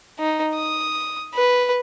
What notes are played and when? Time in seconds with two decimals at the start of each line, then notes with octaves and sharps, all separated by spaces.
0.19 D#4
0.56 D#6
1.35 B4